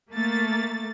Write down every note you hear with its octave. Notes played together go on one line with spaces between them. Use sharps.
A3 A#3 A6